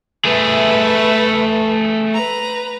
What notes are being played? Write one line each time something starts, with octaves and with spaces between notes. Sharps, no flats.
A3 G#4 B4 E5
B4 A#5